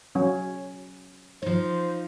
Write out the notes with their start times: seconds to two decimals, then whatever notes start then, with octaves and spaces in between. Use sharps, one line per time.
0.15 F#3 C#4
1.42 F3 D#4 C5